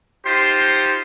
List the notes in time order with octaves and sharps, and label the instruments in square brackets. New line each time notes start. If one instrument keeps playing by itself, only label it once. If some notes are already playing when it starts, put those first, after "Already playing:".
[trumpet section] D#4 F4 G4 C5 C6